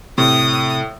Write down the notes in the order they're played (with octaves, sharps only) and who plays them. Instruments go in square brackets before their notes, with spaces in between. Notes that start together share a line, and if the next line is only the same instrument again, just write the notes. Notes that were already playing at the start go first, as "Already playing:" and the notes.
[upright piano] A2 [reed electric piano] C3 [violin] D#6